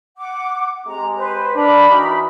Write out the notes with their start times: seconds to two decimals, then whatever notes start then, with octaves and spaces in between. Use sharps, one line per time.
0.17 F#5 D6
0.86 G#3 C4 G4 A#5
1.16 B4 C5
1.55 D4 A#4 B5
1.90 E3 D#4 F#4